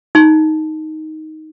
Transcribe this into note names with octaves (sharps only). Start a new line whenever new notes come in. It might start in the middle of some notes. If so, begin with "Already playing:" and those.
D#4